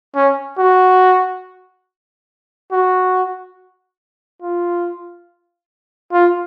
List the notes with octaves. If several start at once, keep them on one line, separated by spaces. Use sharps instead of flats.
C#4
F#4
F#4
F4
F4